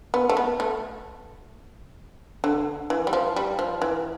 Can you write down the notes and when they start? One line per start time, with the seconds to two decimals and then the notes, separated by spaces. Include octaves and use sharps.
0.14 B3
0.29 A3
0.37 B3
0.60 A3
2.44 D3
2.90 E3
3.07 G3
3.13 F3
3.36 G3
3.59 F3
3.82 E3